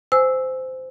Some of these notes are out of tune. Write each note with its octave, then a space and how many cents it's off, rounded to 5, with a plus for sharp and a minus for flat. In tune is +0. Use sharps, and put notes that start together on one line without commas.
C5 -15 G#5 +0 E6 -5